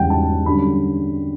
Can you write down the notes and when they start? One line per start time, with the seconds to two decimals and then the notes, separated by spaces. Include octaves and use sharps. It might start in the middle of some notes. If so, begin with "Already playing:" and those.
Already playing: E1 E2 C#3 G3 F#5 G5
0.10 A5
0.46 F#2 D3 G3 B5